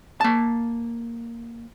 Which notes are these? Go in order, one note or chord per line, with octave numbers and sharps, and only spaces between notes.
A#3 A5